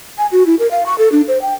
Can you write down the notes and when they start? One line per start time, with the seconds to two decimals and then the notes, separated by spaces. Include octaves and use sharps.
0.18 G#5
0.32 F#4
0.46 E4
0.59 A#4
0.71 F5
0.86 C#6
0.98 A4
1.12 D4
1.28 C5
1.42 G5